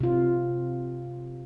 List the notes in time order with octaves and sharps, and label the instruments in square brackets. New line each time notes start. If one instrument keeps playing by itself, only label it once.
[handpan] C3 F4